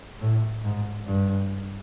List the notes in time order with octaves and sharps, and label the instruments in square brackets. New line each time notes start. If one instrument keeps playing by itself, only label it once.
[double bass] A2
G#2
G2